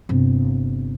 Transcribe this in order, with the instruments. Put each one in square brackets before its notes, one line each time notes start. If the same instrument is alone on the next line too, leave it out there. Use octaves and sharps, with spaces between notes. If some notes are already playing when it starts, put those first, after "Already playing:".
[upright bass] G1 C3